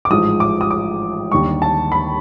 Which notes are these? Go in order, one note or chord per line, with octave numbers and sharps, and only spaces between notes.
D6
A1 G#2 F3 G#3 D#6
D6
D#6
D6
D#2 D3 G3 C#6
A5
B5